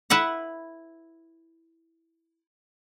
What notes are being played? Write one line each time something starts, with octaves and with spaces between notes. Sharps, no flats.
E4 B4 E5 F#5